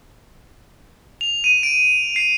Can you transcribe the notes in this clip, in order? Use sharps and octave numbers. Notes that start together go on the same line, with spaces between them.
F7
D#7
D7
C7